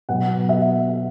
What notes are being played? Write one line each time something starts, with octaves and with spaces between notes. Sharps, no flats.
B2 F#3 B3 F#5
E5